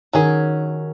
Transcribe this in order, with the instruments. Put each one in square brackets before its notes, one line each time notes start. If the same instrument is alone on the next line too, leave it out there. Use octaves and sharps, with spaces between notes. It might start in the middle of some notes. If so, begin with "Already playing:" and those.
[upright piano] D#3 [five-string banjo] F#3 C#4 G#4